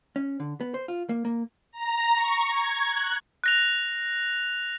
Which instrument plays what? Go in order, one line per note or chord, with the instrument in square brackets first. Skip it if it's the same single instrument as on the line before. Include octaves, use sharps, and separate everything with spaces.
[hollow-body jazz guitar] C#4
D3
B3
C5
F4
A#3
A#3
[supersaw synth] A#5
C#6
G#6
F#6
[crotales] F#6 A#6 F7